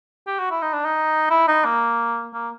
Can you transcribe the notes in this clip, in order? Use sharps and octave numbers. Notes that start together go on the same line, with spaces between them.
G4
F#4
E4
D#4
D4
D#4
E4
D#4
A#3
A#3